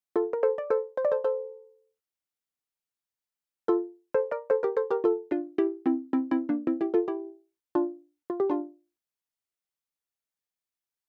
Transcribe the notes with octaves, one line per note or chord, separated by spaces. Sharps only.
F4 A4
A#4
A4 C5
D5
A4 C5
C5
D5
A4 C5
A4 C5
F4 A4
A4 C5
A#4 D5
A4 C5
G4 A#4
A4 C5
G4 A#4
F4 A4
D4 F4
E4 G4
C4 E4
C4 E4
C4 E4
A#3 D4
C4 E4
E4 G4
F4 A4
E4 G4
D4 F4
F4
G4
D4 F4